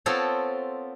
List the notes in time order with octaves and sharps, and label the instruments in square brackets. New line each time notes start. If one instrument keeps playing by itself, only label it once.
[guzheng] B3 C4 F4 A4 C5 C#5